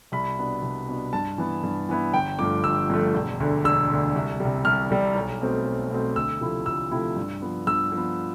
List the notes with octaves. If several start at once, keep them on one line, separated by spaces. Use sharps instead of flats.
C2 B5
B2 B3 D4
C2
B2 B3 D4
G2 A5
E3 B3 E4
G2
E3 B3 E4
G1 G5
G2 F3 A3 D6
G1 E6
G2 F3 A3
E1
D2 D3
E1 E6
D2 D3
C2
C3 G3
C2 F6
C3 G3
B1
B2 A3 C4
B1
B2 A3 C4
D2 E6
C3 F3 A3 E4
D2 E6
C3 F3 A3 E4
G2
F3 B3
G2 E6
F3 B3